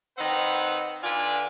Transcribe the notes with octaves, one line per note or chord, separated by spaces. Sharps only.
D#3 C4 D#4 B4 F#5
D3 F4 B4 D5 G#5